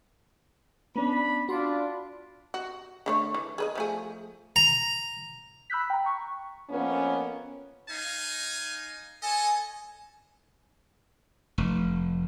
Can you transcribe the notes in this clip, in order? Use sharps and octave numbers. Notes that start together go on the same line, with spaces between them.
B3 C#4 D4 B5
D4 F4 F#4 D5 B5 C6
F#4
D3 A3 C#5
E3
G#4 B4 D#5
F3 A3 G#4
A#5
B5 E6 F#6 G6 B6
G5 A#5
C#6
F2 A#3 B3 C#4
D#4 F5 G#5
A4 C#5 D#5 G#5
F1